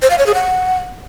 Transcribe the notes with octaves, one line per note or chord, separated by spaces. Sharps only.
C5
F5
C#5
G#4
F#5